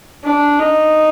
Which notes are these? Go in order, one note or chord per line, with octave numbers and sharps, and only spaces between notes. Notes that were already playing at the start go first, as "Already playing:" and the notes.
D4
D#4